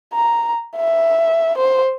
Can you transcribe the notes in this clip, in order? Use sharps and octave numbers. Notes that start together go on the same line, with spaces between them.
A#5
E5
C5